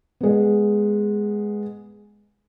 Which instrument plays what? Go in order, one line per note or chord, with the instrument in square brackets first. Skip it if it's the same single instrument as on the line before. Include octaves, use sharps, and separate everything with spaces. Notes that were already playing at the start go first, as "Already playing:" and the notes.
[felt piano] G#3 B3